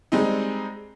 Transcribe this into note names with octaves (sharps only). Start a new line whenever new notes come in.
G3 G#3 C4 D#4